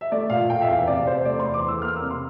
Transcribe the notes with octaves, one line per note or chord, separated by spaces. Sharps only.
E5
A3 D5
A#2 F5
A#2 G5
E5
E2 F5
C3 D5
C3 C5
A3 D5
C6
E2
D6
E2
E6
A#3 F6
E6
C3
C6